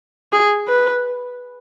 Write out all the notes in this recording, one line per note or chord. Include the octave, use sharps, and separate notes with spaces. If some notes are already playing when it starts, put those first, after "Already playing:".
G#4
B4